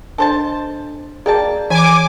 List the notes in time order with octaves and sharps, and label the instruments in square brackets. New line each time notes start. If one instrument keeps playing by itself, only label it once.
[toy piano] D4 D#5 [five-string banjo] A4 C5 A5
[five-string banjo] A#3 G5 A5 [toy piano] G#4 D5
[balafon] E3 [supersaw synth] G#5 D6 [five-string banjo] B5